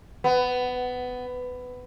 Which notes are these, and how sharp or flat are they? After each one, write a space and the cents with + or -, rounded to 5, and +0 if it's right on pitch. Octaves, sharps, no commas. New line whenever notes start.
B3 +15